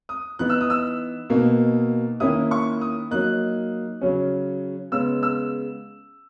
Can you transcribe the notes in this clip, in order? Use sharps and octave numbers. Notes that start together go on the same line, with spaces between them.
D#6
E3 B3 D#4 F#6
E6
D#6
E6
B2 A#3 D#4
D#3 A#3 C#4 E4 D#6
C#6
D#6
F#3 A#3 D#4 F#6
C#3 F#3 C#4
C#3 G#3 B3 E6
E6